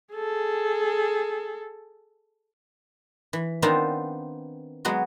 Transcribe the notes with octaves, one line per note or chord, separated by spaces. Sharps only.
G#4 A4
E3
D#3 B3 C4 D4 F4 A#5
F#3 G#3 B3 F#4